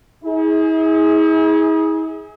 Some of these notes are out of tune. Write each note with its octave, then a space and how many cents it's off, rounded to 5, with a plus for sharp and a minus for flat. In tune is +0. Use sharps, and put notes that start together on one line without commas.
E4 -45 G#4 +0